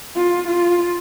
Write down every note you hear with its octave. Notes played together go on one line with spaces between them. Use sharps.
F4
F4